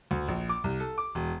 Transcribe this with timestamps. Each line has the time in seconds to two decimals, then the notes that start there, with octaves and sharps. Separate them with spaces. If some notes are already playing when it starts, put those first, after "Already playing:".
0.11 D2
0.28 A#1
0.49 D6
0.64 C2
0.80 A4
0.98 D6
1.15 E1